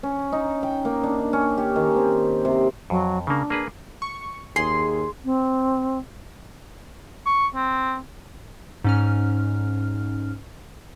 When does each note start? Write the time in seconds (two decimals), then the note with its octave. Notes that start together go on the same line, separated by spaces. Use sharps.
0.03 C#4
0.32 D#4
0.63 G5
0.85 A#3
1.04 D4
1.33 C#4
1.58 G4
1.76 D#3
1.96 C4
2.45 C3
2.90 F2 F#3
3.27 C#3 A#3 D4
3.50 A#3 G#4 B4
4.02 C#6
4.56 D#2 G#4 C6
5.24 C4
7.26 C#6
7.56 C4
8.84 G#2 C#4 F6